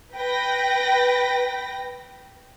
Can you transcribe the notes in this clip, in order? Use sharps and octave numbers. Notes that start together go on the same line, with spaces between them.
B4 G5 A#6